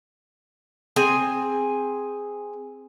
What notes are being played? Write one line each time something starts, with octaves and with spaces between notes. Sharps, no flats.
C4 G#4 G#5